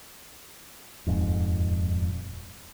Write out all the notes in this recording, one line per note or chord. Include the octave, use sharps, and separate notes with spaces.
D#1 F2 G#2